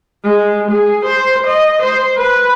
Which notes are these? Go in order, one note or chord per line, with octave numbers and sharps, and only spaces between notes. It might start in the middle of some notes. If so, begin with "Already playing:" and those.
G#3
G#4
C5
D#5
C5
B4